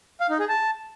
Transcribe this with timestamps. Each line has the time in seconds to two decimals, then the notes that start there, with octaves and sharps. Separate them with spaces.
0.20 F5
0.30 D#4
0.39 G#4
0.49 A5